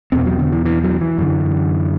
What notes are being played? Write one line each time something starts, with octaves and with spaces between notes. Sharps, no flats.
E2 B2 C4
F#3
D3
E3
E3
F#3
E3
F#2 D3